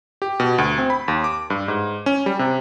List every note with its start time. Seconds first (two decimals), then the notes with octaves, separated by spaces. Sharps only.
0.22 G4
0.40 B2
0.58 D2
0.78 C4
0.90 B5
1.08 D#2
1.24 D6
1.50 G2
1.68 G#2
2.06 C#4
2.26 G3
2.39 C3